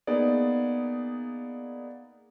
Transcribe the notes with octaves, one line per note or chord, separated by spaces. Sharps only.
A#3 B3 D#4 G#4 D5